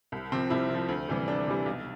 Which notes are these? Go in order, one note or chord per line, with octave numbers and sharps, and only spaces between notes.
C2
C3 F3 C4
C2 E4
C3
F3
D2
C3 E3 G3
D2 D4
C3 E3 G3
B1